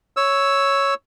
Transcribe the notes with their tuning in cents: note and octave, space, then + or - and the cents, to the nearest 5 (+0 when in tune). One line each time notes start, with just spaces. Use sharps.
C#5 +0 E6 +0